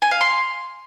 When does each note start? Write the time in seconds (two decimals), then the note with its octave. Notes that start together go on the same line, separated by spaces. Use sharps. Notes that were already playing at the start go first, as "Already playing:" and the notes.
0.02 G#5
0.11 F5
0.21 C6